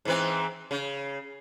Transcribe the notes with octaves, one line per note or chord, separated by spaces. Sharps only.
G#2 E3 C4
C#3